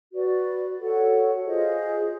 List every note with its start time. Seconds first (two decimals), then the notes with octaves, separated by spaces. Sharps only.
0.12 F#4 B4 D5
0.78 F#4 A4 C#5 F#5
1.45 F4 G#4 C5 D#5